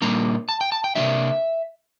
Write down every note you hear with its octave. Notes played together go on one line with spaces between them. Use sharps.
A#2 G3 A#3 D4 A#5
A5
G5
A5
G5
C3 G3 A#3 D4 E5